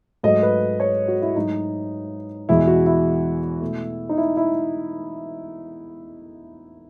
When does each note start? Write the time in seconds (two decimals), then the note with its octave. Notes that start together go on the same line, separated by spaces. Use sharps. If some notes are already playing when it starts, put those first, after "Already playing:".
0.23 G#2 F#3 A3 D#5
0.43 B4
0.80 C#5
1.08 F#4
1.22 E4
1.36 G#2 F#3 A3 D#4
2.49 E2 B2 G#3 E4
2.67 F#4
2.86 E4
3.62 B2 A3
4.09 D#4
4.18 E4
4.37 E4